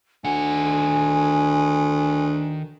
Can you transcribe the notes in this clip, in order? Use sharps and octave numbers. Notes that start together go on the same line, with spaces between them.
D2 D#3 F#5 G#5